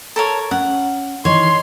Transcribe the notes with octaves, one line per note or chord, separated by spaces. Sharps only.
A4 A#4 C#5
C#4 F#5
D#3 E3 C#5 C6